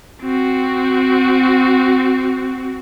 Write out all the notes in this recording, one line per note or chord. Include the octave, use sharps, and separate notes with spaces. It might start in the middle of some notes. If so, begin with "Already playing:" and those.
C4 F#4